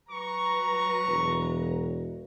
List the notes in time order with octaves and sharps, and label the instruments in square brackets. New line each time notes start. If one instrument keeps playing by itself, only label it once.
[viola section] F#3 B4 A#5 [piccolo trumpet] C#6
[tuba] E1